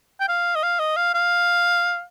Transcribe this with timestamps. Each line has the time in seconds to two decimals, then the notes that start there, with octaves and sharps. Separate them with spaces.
0.20 G5
0.29 F5
0.55 D#5
0.63 F5
0.80 D#5
0.96 F5
1.14 F5